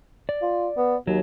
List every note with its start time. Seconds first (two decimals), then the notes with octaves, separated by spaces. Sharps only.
0.29 D5
0.42 F4
0.77 B3
1.07 D#2 F#3